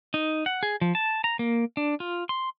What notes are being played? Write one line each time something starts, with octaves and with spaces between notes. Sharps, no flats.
D#4
F#5
G#4
F3
A5
A#5
A#3
D4
F4
C6